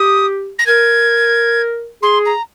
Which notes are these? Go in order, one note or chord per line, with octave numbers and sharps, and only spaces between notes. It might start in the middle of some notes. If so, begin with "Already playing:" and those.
Already playing: G4 D#6
A#6
A#4 G#6
G#4 C6
A#5